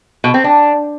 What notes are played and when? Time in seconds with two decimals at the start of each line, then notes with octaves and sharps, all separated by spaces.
0.24 B2
0.34 C4
0.44 D4